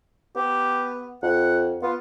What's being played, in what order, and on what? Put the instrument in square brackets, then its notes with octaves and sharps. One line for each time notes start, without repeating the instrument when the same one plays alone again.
[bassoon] B3 [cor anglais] G4
[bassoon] F2 [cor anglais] F#5
[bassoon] B3 [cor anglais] F4